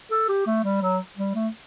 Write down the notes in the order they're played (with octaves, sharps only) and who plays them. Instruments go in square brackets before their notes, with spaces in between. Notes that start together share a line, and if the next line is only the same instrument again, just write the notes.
[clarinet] A4
G4
A3
G3
F#3
G3
A3